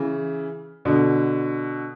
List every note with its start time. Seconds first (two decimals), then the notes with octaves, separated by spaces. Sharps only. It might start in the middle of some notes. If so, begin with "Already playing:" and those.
Already playing: C#3 E3
0.85 B2 D3